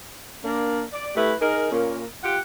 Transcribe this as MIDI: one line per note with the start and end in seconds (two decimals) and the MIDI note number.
0.44 0.81 58
0.44 0.81 62
0.92 1.09 74
1.16 1.34 57
1.16 1.34 64
1.16 1.34 67
1.16 1.34 71
1.41 1.71 63
1.41 1.71 68
1.41 1.71 70
1.72 2.04 46
1.72 2.04 58
1.72 2.04 61
2.24 2.39 65
2.24 2.39 67
2.24 2.39 78